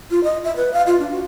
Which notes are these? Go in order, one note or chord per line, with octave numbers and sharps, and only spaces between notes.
F4
D#5
E5
B4
F5
F4
D4
F#4